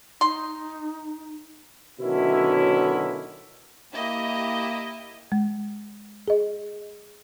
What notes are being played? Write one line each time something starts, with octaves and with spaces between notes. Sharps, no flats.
D#4 C6
B2 D3 D#3 F#3 C#4 E4
A#3 E4 G4 D#5
G#3
G#4 D#5